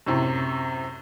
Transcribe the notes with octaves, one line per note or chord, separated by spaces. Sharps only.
F#2 A2 C3